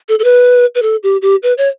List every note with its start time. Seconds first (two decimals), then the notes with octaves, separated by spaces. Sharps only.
0.09 A4
0.19 A4
0.24 B4
0.75 B4
0.82 A4
1.03 G4
1.22 G4
1.43 B4
1.58 C#5